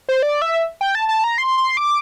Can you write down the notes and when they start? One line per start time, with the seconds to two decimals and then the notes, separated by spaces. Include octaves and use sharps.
0.09 C5
0.22 D5
0.42 E5
0.81 G5
0.95 A5
1.09 A5
1.24 A#5
1.38 C6
1.58 C6
1.77 D6